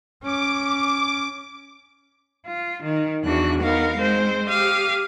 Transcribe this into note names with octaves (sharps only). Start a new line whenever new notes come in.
C#4 D6
F4
D#3
E2 E3 D4 F#4 F#6
B3 D#4 A#4 F5
G#3 C4 C5
G4 F5 D#6